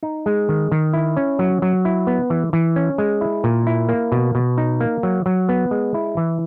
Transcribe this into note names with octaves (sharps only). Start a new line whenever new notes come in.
D#4
G#3
D#3
D#3
E4
C#4
F#3
F#3
E4
B3
E3
E3
C#4
G#3
E4
A#2
E4
A#3
B2
B2
D#4
A#3
F#3
F#3
B3
G#3
E4
E3